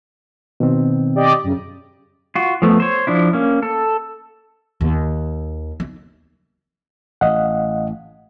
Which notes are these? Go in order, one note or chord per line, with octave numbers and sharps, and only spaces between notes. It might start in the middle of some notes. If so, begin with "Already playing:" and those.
B2 D#3 C4
G4 D5 D#5
F#2 C#3
F4 F#4
F3 A3 B3
C5 C#5
F3 D4 E4
A#3 C#4
A4
D#2
D#4
A1 D#5 F5 F#5